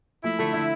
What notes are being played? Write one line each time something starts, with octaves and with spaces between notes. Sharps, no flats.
F3 A3 E4
D3 F3 A3
D3 E4